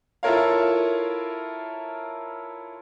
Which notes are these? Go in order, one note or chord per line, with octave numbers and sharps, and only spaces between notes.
E4 F4 A4 A#4 C#5 F5